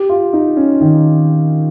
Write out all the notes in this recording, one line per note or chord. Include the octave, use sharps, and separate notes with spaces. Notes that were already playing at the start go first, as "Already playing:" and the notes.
Already playing: G4
F4
D#4
C#4
D#3